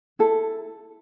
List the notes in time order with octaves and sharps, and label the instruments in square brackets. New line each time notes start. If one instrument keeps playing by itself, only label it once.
[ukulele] E4 A4